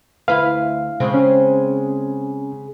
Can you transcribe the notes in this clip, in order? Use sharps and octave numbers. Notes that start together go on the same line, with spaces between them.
D2 E4 B4 F5
C#3 G#3 C4
C#4